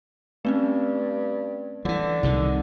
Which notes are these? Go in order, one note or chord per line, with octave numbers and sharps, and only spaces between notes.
G2 A3 C4 C#4
D3 E3 F3
C2 C3 D#3